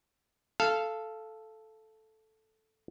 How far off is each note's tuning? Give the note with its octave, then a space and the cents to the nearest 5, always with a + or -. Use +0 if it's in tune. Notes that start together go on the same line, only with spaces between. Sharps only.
A4 -5 F5 -15